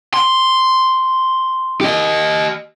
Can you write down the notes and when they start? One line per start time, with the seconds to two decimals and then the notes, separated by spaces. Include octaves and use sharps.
0.14 C6
1.81 G4 D#5